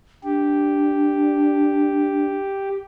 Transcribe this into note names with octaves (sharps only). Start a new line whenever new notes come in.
D4 G4